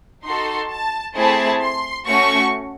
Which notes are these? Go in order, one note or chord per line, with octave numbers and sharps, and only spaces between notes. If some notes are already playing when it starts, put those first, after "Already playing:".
D#4 F#4 A4 C6
A5
A3 C4 E4 G#4 A5
C6
A3 C#4 F#4 C#6